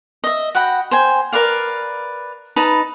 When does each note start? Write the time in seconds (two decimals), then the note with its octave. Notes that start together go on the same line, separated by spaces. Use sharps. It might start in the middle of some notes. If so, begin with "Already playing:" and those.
0.24 D#5 E5
0.55 F#4 F#5 G5 B5
0.91 C5 G5 G#5
1.33 A#4 B4 D5 F5
2.56 D#4 B4 A5 B5